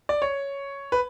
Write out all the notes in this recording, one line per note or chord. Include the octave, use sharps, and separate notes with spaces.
D5
C#5
B4